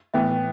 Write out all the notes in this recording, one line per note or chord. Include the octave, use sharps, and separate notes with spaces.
A2 E3 B3 E5 G5